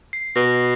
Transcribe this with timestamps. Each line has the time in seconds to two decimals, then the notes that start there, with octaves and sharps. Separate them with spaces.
0.13 C7
0.36 B2 A#6